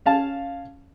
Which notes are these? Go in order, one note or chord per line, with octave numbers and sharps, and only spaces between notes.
C#4 F5 A5